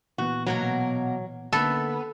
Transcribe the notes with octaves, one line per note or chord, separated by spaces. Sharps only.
A#2 E3 B3 F#4
B2 F#3 A#3 A#4
D3 A#3 B3 A4 E5